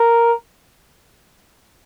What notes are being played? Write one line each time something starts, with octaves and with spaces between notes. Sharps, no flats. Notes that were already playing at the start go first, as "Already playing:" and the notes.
Already playing: A#4